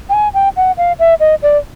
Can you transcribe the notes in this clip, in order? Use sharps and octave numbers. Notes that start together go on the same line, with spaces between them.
G5
G#5
G5
F#5
F5
E5
D#5
D5